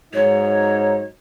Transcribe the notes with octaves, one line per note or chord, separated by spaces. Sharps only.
G#2 F#3 D#4 C#5